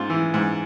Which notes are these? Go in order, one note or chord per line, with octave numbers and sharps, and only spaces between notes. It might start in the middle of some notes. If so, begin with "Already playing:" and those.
Already playing: G#2 F4
E3
G#2